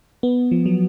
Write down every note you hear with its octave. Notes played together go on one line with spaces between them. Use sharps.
B3
F3
F#3